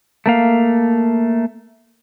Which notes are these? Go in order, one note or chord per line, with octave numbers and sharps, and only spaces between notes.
A3 A#3 F5